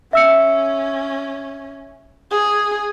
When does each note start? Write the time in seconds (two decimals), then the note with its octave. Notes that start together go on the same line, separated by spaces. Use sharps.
0.13 C#4 E5 E6 C#7
2.31 G#4